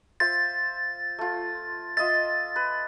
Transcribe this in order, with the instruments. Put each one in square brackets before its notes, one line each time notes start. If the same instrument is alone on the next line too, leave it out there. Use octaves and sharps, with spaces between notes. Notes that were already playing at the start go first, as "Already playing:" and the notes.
[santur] F4 C5 E5 [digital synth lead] A6
[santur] A3 F4
[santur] F4 D#5 E5 [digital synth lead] A6
[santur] B4